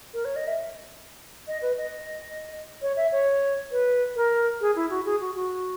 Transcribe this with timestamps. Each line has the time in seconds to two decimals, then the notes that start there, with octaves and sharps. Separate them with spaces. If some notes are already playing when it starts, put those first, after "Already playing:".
0.14 A#4
0.25 C#5
0.36 D#5
0.47 E5
1.48 D#5
1.62 B4
1.77 D#5
2.82 C#5
2.97 E5
3.12 C#5
3.72 B4
4.16 A#4
4.61 G#4
4.76 E4
4.90 F#4
5.06 G#4
5.21 F#4
5.35 F#4